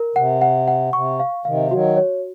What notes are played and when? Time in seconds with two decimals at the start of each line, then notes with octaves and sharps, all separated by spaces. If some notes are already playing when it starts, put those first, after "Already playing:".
Already playing: A#4
0.16 C3 F#5
0.42 F#5
0.68 F#5
0.93 C3 C#6
1.20 F5
1.45 C3 D#3 F5
1.71 D#3 F#3 F#4
1.97 C#5